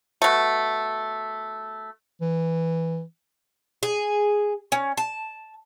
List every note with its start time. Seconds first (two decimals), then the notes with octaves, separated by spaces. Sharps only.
0.22 B2 A3
2.21 E3
3.83 G#4
4.72 C#4
4.97 A5